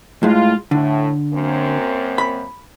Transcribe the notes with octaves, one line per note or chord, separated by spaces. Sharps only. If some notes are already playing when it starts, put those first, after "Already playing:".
A2 G#3 F4
A2 D3
F#2 A#3 C4
B5